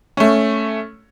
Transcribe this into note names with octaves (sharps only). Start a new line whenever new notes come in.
A3 C#4